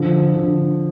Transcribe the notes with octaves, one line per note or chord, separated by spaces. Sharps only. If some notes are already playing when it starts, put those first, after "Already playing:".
Already playing: D3 F3
D3